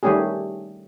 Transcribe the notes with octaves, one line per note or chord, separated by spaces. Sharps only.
D#3 G3 A3 C#4 G4 G#4